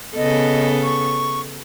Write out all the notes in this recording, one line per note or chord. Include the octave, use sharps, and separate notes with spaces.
C#3 B3 A4 D#5
C#6